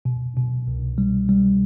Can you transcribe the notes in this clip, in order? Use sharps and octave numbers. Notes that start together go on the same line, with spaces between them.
B2
B2
C2
G3
G3